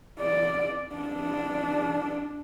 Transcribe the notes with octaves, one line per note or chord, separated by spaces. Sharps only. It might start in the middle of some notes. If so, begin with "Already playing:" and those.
D5
D4